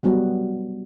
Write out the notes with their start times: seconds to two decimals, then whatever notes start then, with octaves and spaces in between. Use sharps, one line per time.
0.03 F#3 G3 B3 F#4